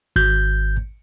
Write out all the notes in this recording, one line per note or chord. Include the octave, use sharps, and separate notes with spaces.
G#1 G6